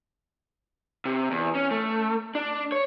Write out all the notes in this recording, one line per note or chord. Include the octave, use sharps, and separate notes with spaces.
C3
E2
C#4
A3
D4
C#5